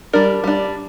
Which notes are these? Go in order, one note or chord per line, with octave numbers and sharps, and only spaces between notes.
G3 D4 A#4
G3 D4